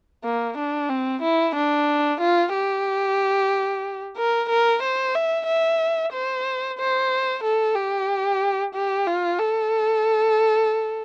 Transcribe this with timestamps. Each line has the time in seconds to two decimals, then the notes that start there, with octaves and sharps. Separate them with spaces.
0.24 A#3
0.57 D4
0.90 C4
1.22 E4
1.56 D4
2.20 F4
2.53 G4
4.16 A#4
4.49 A#4
4.82 C5
5.15 E5
5.47 E5
6.13 C5
6.79 C5
7.43 A4
7.75 G4
8.74 G4
9.07 F4
9.39 A4